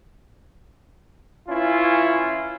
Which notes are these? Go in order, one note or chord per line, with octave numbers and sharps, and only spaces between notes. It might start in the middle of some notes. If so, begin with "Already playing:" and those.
E3 C#4 E4 F4